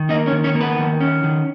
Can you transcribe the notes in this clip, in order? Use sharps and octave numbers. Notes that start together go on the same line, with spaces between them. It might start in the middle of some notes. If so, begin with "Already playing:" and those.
Already playing: D#3
A#3 D#4 D#5
C#4 C#5
D#3
C#4 C#5
A#3
B3 B4
D#3
C#4
D#3